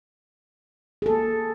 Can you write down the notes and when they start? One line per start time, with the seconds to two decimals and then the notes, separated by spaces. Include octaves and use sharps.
1.02 G#4
1.06 A4
1.10 A#3